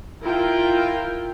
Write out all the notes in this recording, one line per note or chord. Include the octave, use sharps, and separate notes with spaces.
E4 F4 A#4 G5